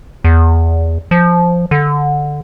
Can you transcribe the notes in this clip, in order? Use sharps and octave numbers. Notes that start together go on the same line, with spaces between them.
E2
F3
D3